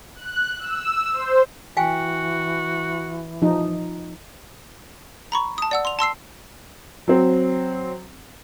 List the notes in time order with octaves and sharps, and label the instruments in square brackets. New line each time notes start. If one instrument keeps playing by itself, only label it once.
[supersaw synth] F#6
E6
C5
[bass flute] E3 [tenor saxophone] F#4 [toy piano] F5 G5 G#5
[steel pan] F3 D#4
[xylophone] A#5 B5 C#6
A5 D#6
D5 F#5 E6
C6 F7
A5 C6 E6 C7
[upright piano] F#3 C4